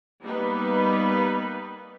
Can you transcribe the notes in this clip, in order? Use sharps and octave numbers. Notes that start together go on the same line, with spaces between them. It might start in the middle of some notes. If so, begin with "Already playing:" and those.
G3 A#3 B3 D#4 B4